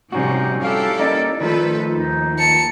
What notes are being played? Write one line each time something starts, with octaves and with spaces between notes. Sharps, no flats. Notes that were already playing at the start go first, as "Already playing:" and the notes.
A2 C3 F3 G3 C#4 D#4 F#4
E4 G4 A4 F5
A#3 C#4 D#4 D5
D#3 F3 A3 F4 A4 B4
D#2 D#4
A5 C#7